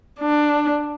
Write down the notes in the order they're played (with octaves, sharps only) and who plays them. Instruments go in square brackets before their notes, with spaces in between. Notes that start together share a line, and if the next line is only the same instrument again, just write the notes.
[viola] D4